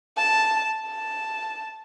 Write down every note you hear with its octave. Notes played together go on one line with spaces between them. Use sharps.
A5
A5